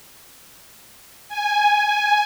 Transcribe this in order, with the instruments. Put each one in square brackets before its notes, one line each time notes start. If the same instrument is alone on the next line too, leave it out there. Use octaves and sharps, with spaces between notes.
[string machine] G#5